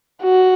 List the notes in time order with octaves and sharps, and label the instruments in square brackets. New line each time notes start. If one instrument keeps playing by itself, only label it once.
[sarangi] F#4